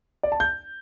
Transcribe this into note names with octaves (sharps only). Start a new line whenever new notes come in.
D5
A5
G6